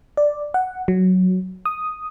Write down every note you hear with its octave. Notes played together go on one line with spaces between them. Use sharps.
D5
F#5
F#3
D#6